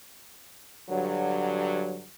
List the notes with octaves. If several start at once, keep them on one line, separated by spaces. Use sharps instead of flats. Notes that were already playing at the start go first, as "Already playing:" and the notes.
G2 D3 F#3